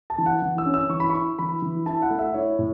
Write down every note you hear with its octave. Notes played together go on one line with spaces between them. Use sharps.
A5
E3
F#5
E3
E6
C#4
E6
E3 C#6
B5
C#6
E4
E3 B5
E3
E4 A5
F#5
A3
E5
E4 C#5
A2